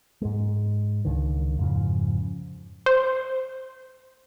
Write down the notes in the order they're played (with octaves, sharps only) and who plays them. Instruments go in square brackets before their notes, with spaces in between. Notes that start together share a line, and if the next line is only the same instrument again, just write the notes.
[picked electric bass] G#2 G#3
C#2 D3 D#3
F2 G#2 C#3 F3
[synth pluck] C5